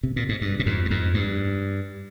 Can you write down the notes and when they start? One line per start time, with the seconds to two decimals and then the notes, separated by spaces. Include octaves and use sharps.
0.03 C3
0.16 A#2
0.29 G#2
0.41 G2
0.59 A#2
0.66 F2 G#2
0.85 G2
0.90 F2 G#2
1.14 G2